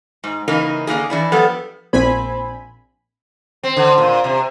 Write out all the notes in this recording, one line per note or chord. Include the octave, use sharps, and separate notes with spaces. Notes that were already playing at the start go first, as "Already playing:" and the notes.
G#2
C#3 E3 A#3 D#4 A#4
D3 A#3 E4 G#4
E3 D4 E4
F3 G3 B3 A4
A#1 C4 G#5 B5
C4
D3
A#2
C3